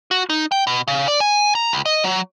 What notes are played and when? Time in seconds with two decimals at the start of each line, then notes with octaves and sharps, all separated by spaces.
0.11 F#4
0.30 D#4
0.52 G5
0.67 B2
0.88 C#3
1.08 D5
1.20 G#5
1.55 A#5
1.72 C#2
1.85 D#5
2.04 F#3